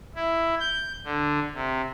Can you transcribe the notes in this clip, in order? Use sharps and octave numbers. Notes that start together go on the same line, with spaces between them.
E4
G6
D3
C3